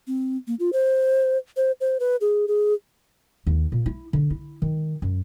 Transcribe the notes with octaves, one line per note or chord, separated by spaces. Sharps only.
C4
A#3
F4
C5
C5
C5
B4
G#4
G#4
D#2
A#2
E4
D3
E4
D#3
F#2